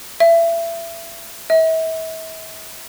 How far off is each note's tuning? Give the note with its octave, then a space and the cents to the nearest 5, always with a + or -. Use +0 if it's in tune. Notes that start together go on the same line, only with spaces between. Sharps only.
E5 +30
E5 -40